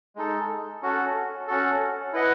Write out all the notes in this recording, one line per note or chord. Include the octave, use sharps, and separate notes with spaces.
G#3 D#4 A4
C#4 F#4 A4
C#4 F#4 A4
E4 B4 D#5 F#5